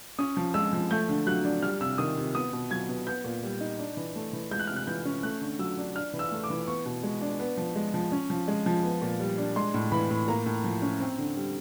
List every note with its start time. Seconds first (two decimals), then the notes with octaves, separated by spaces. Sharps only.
0.18 C#4 D#6
0.37 F3
0.54 G#3 E6
0.73 F3
0.91 A3 G6
1.09 D3
1.27 F#3 F#6
1.45 D4
1.62 G3 F6
1.81 C3 E6
1.98 D#3 D#6
2.17 C3
2.35 B3 D#6
2.53 B2
2.71 F#3 G#6
2.89 B2
3.07 B3 G6
3.24 A#2
3.43 G3
3.60 D#4
3.79 D4
3.97 E3
4.15 A3
4.33 E3
4.51 G#3 G6
4.59 F#6
4.67 C3 F6
4.76 F#6
4.87 E3 G6
5.05 C#4
5.23 A3 F#6
5.41 D3
5.59 F#3 E6
5.78 D4
5.96 D4 F6
6.13 E3
6.19 E6
6.31 A3
6.44 D6
6.50 E3
6.67 B3 C#6
6.85 B2
7.03 G#3
7.21 D4
7.40 B3
7.57 F3
7.76 G#3
7.94 F3
8.12 C#4
8.30 F3
8.48 G#3
8.66 F3
8.83 B3
9.02 A#2
9.20 G3
9.38 D4
9.56 G#3 C6
9.74 A2
9.92 E3 B5
10.11 A2
10.28 A#3 A#5
10.46 A2
10.64 F3
10.82 C#4
11.00 C4
11.18 D3
11.36 G3